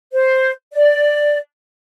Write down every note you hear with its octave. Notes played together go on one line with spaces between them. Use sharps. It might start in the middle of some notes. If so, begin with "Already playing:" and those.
C5
D5